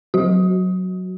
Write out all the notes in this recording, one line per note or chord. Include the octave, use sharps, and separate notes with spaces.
F#3 F#4